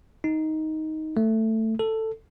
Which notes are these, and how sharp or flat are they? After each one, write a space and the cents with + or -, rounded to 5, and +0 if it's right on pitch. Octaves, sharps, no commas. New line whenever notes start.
D#4 +10
A3 +10
A4 +10